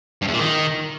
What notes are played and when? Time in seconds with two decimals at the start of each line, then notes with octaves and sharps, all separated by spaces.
0.22 G2
0.28 E2
0.34 A#2
0.39 D#3